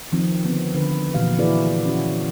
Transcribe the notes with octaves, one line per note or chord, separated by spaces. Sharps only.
D#3 F3 C4
D3 D#3 B3 C4
D3 B4
A#2 E3 F3 F#4 G4 F5
E4 F#4 G#4 B4 D5
C#4 F#4